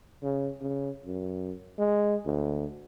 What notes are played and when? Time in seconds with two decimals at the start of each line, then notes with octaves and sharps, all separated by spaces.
0.23 C#3
0.61 C#3
1.05 F#2
1.78 G#3
2.25 D2